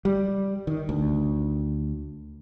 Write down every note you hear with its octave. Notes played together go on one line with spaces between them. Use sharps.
G3
D#3
D2